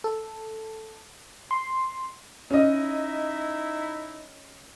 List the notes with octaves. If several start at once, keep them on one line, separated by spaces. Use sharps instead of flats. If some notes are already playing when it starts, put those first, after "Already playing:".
A4
C6
C#4 D#4 E4 D#5